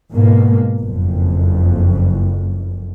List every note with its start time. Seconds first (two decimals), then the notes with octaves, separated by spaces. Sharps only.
0.11 G#2 B2 A#3
0.81 F#1 F2